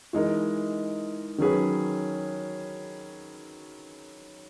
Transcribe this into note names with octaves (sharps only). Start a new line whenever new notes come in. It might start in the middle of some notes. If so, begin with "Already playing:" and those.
E3 G#3 D#4 A#4
D#3 F#3 C#4 G#4 B4